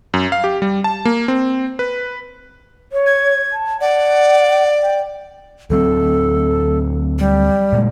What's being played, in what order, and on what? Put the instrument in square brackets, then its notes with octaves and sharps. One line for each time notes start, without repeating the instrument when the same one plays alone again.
[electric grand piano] F#2
F5
G4
G3
A5
A#3
C4
B4
[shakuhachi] C#5
[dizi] G#6
[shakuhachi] A5
[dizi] D5 [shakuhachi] F#5
[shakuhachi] G5
[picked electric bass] D2 F#3 C4 [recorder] A4
[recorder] G3
[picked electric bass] A#2 G#3 A#3